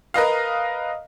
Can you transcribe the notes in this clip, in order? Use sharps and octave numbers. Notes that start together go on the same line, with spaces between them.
A#4 B4 D#5 F5